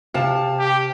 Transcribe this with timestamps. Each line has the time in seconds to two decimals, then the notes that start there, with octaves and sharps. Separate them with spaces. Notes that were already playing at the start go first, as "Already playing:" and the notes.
0.14 C3 F5 A5
0.59 G4